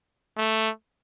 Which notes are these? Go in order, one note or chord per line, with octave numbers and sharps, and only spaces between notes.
A3